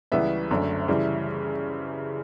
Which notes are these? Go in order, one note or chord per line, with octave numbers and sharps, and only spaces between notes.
C#2 C#3 E3 G3 B3 E5
F#1 F#2 D3 A3
C#3 E3 G3